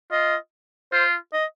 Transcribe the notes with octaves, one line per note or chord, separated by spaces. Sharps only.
F4 D#5
F4 C5
D#5